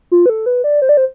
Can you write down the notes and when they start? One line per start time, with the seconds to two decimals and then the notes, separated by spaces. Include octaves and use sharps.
0.11 F4
0.26 B4
0.30 A4
0.46 B4
0.64 D5
0.82 C5
0.89 D5
0.97 C5